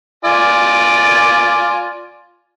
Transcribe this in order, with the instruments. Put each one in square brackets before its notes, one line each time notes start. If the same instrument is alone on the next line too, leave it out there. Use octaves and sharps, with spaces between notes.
[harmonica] F4 D5 G#5